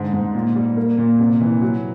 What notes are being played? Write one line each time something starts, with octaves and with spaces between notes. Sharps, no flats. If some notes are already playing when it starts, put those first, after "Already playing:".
Already playing: G#2 D3
G#2
A#2
G3
A#3
A#2
C3
E3
F#3